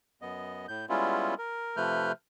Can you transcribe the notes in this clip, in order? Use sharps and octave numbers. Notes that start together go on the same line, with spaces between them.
F#2 B3 D#5
A2 G6
G3 G#3 B3 C#4 E4 F4
A#4
C3 F3 A3 B4 F6 G6